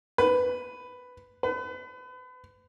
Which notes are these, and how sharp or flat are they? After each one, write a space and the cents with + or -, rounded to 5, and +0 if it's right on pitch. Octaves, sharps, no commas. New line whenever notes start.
B4 +10
B4 +35